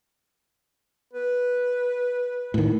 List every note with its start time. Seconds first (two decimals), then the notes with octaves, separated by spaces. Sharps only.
1.13 B4
2.54 A2 D#3